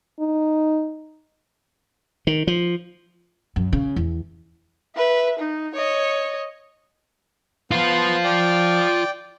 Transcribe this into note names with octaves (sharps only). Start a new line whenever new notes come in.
D#4
D#3
F3
F#2
C#3
E2
B4 E5
D#4
C#5 D#5
B3 F4 C5 C6
D5 G5